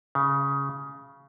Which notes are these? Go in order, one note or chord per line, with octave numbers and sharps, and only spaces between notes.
C#3